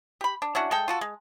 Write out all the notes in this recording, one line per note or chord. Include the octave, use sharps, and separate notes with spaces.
G4 B5
D4
C#4 D4 E4 F#4
G#3 A4 G5
F4 F#4 A4
G#3